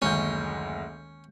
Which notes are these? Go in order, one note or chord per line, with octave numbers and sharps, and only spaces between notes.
F#1 D2 D#3 G#3 A#3 C#4 G6